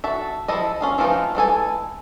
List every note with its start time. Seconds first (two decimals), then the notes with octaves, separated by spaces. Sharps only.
0.04 F#4 A4 E5
0.48 F3 E4 A4 D#5
0.81 C#4 F4 G#4
0.98 E3 F3 A3 D#4 F4
1.35 E3 G#3 A4 G#5